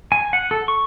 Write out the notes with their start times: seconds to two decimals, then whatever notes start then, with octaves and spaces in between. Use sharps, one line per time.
0.12 G#5
0.33 F#5
0.51 A4
0.68 C#6